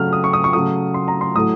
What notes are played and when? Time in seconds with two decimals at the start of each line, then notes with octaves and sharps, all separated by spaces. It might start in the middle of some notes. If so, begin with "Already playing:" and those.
Already playing: C#3 F#3 A3 F6
0.13 D#6
0.24 C#6
0.33 D#6
0.44 C#6
0.53 C#3 F#3 A3 D#6
0.94 C6
1.08 A#5
1.21 C6
1.35 A2 F#3 A3 D#6